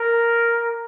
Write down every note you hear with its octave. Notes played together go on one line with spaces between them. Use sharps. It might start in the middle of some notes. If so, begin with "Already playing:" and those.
Already playing: A#4